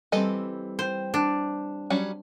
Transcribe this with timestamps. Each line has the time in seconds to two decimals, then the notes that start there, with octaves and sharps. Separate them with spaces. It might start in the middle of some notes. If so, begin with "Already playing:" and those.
0.12 E3 G3 C4 A4 D#5
0.79 C5 G5
1.14 D4
1.90 F#3 G3 C#4